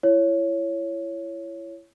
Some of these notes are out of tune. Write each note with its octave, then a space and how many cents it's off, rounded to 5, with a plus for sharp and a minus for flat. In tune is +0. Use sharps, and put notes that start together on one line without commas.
E4 +30 C#5 +0